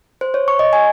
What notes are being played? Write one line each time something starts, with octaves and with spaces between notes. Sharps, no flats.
C5
C#5
C#6
D#5
G#5